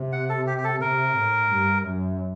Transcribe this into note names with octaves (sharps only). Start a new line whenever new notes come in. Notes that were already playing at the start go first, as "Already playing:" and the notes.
Already playing: C3
F#5
A4
G4
G4
A4
C3 A#4
A2
G2
F#2